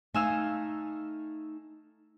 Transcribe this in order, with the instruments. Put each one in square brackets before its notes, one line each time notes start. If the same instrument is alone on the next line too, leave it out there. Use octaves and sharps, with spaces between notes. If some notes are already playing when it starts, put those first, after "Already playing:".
[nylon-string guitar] A3 D#4 F5 [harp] G#5 E6 F6